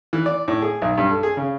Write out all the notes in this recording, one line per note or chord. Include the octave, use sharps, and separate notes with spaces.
E3
D5
A2
G#4
B1
G2
A4
G#4
C#3